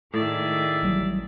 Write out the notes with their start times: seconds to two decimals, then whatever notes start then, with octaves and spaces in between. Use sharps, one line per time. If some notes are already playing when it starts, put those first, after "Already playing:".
0.14 A2 D#3 G#4 D5 E5
0.83 A1 F#3 G3